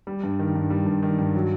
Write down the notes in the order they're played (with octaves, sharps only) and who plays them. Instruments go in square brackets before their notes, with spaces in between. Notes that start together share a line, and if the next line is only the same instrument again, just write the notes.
[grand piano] G3
G2
D#3
G2
G3
G2
D#3
G2
F#3